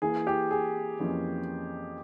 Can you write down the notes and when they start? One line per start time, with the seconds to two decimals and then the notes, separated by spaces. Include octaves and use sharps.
0.02 E3 A#3 E4 G#4
0.27 G4
0.51 G#4
0.99 F2 E3 A#3 C#4